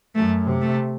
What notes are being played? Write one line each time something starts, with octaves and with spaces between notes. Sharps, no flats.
F#2 A3
C3
A3